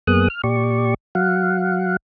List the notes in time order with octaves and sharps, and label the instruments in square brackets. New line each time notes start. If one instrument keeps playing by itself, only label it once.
[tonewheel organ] F#2 A#3 B3 G#4 D#6 F#6
F6
A#2 G4 D5 C#6
F#3 F5 F#5